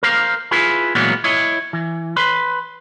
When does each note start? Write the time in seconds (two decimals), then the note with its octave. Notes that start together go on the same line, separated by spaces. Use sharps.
0.03 A#4 C5 F5
0.51 E4 F4 G#4 B4
0.95 A#2 E3 F#3 G#3 A#3 B3
1.24 E4 C#5 D#5
1.73 E3
2.17 B4 B5 C6